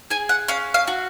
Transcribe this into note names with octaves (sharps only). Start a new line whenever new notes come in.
G#4 G#5
F#5
C#4 F5
F5
F#4